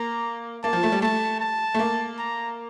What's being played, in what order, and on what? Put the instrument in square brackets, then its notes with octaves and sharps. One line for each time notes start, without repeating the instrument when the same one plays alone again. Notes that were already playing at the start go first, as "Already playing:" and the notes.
Already playing: [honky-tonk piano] A#3 [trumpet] A#5
[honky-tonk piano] A#3 [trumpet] A5
[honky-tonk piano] F3
A3
G3
[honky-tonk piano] A3 [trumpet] A5
[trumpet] A5
[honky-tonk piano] A3
A#3
[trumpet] A#5